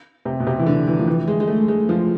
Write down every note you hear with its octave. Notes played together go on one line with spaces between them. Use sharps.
C3
B2
C3
E3
D3
E3
F3
E3
G#3
G#3
A3
G#3
F3